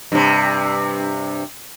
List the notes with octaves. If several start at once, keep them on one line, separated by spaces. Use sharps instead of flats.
G2 C3